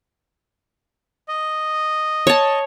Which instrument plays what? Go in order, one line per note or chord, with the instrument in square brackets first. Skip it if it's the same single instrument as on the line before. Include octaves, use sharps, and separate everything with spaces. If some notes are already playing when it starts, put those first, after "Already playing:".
[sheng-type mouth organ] D#5
[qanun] C#5 A5